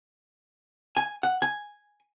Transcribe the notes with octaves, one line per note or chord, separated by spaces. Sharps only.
G#5
F#5
G#5